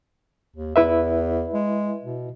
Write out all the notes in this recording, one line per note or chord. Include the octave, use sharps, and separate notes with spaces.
D#2
E2 E4 B4 E5
G#3
B2